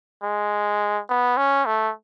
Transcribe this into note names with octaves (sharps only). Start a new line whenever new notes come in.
G#3
B3
C#4
A3